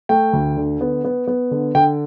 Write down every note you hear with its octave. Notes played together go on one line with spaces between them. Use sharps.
A3 G5
D2
D3
B3
B3
B3
D3
D3 G5